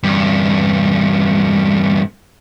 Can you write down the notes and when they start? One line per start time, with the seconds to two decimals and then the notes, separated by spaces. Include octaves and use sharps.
0.03 E2 G2